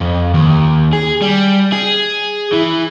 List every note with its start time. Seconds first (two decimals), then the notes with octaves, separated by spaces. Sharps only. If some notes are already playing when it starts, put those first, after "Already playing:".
0.01 F2
0.34 D#2
0.93 G#4
1.22 G3
1.73 G#4
2.53 E3